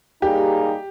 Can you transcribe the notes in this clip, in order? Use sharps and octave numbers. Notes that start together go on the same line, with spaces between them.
G3 A#3 D#4 G4 G#4